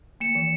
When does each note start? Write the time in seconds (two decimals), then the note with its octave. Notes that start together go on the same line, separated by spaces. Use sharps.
0.20 A#3 C#7 E7
0.35 E3